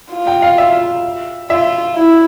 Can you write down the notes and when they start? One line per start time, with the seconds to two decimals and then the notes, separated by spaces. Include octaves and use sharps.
0.13 F4
0.27 G5
0.42 F5
0.58 E5
1.50 F4 E5
1.96 E4